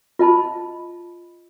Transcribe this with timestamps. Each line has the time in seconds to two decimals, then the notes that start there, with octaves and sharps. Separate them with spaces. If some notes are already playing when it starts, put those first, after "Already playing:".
0.19 F4 D#5 A5 B5